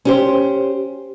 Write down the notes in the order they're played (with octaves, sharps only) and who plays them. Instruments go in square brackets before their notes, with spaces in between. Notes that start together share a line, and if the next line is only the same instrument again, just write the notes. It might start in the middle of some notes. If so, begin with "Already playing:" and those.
[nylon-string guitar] C#4 G4 C5